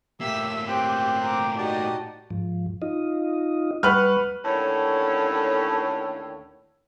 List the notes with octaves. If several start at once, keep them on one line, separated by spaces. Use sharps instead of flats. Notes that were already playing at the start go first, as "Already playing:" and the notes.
A2 A#3 G4 E5 E6 B6
C4 G4 G5 F#6
A#5 D6
D#4 F#4 G4 D5 D#5 A5
G#2 F3
D#4 F4 D#5
G3 B4 F#5 C#6 F6
D#2 A2 D3 C#4 A4 C#5